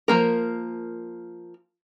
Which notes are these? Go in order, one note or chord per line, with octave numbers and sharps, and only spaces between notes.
F3 A#3 A#4